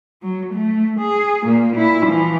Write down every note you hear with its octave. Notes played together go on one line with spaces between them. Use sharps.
F#3
A3
G#4
A#2 A#3
A#2 E4
E3 F3